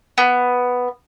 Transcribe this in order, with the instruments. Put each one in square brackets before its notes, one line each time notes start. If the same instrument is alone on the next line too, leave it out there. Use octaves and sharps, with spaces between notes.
[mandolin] B3